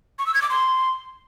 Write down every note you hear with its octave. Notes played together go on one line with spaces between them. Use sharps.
C#6
E6
G#6
D6
C6